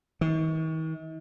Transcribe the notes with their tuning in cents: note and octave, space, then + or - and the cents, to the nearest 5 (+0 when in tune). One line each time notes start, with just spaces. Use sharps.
D#3 +45